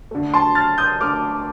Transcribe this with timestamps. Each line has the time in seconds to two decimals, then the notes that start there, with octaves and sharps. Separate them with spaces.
0.11 D3 A3
0.34 A5 C6
0.55 F6 A6
0.78 D#6 G6
1.01 D3 A3 D6 F6